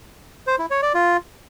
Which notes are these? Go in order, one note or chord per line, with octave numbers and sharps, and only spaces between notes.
C5
E4
C#5
D5
F4